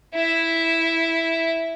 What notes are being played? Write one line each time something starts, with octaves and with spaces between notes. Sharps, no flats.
E4 E5